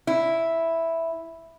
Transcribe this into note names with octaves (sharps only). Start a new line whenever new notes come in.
E4